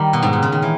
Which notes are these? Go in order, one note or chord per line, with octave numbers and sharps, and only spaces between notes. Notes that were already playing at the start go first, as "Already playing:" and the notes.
Already playing: D#3 G3
B2
G#2
A#2
C#3
D#3
E3